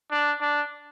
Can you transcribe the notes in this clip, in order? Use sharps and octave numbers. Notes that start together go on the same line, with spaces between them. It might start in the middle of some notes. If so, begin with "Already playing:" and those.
D4
D4